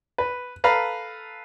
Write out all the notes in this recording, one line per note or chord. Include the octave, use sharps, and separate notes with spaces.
B4
A4 B4 F5 A#5